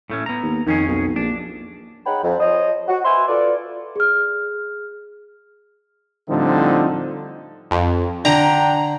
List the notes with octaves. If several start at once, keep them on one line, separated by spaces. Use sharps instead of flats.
A2 A3 C#4
B3 A#5
D#2
F2 D#3 C#4 G#4
B1
A#1 D4
D#4 G#4 C#5 F#5 G5 B5
F2
F3 C5 C#5 D#5
F#4
B4 C5 E5 G#5 C6
F4 A4 B4 D5
G#4 F6
A2 D3 F3 G3 C4 D#4
F2
D3 D4 G5 A#5